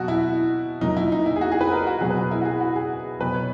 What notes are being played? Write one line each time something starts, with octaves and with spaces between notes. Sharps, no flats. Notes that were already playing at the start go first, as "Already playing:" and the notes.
Already playing: B2 F#3 F#4
E4
A#2 F#3 D#4
E4
D#4
E4
G#4
F#4
G#4
B4
A#4
F#4
B2 F#3 G#4
B4
A#4
E4
F#4
G#4
F#4
G#4
B2 F#3 B4
C#5